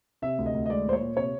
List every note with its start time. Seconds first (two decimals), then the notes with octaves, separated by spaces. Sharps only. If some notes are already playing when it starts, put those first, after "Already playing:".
0.22 C3 E5
0.38 D2
0.46 D#5
0.54 D2
0.66 D#5
0.70 G#3 D5
0.86 A#2 C5
0.93 C#5
1.01 A#2
1.17 C3 C#5